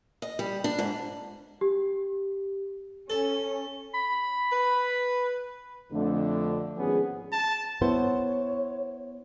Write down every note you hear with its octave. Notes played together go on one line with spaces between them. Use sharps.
D#5
G3
D4
G#2
G4
C#4 A4
B5
B4
F2 D3 A3
G#1 F3 B3 C#4 G#4
A5
B3 E4 C5 C#5